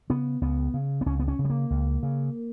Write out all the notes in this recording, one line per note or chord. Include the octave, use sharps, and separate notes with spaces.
C#3 B3
C#2 B3
C#3
B3
C#2 C#4
B3
C#4
C#3
G3
A#3
C#2
C#3